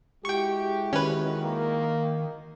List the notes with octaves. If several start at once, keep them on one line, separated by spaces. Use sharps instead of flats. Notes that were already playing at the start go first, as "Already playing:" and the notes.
G#3 E4 F#4 G4 G5 C#6
D#3 C#4 B4
A#3